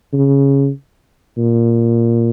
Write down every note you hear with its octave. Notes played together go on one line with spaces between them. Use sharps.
C#3
A#2